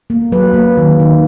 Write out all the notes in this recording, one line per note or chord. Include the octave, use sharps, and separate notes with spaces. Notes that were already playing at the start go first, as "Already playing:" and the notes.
A#3
F#3 B4
A#3
D#3
D#3